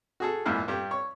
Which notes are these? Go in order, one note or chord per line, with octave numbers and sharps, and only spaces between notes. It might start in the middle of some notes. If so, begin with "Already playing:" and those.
F#4 G#4 A4
A#1 E2 G#2 E4 F5
G2 G4
C#5